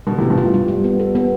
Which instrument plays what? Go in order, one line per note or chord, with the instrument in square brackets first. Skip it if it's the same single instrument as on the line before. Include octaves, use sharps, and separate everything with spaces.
[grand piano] B2 D3 [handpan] G3
[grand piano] A2 C3 [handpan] B3
[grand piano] G2 B2
[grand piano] A2 [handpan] F4
[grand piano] G2 [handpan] G3
[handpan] G3
B3
A4
B3